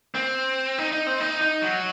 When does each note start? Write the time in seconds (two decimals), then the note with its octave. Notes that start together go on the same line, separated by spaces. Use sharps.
0.15 C4
0.78 D#4
0.92 D#4
1.07 C4
1.20 D#4
1.41 D#4
1.62 F#3